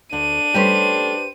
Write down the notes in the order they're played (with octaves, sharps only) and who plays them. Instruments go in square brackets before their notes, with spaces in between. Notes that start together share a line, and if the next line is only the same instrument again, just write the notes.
[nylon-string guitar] D2 [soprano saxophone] D4 [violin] D#7
[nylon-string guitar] G3 A3 C#4 [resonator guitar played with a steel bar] G4 B4 C5